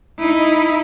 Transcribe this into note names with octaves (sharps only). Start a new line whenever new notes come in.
D#4 E4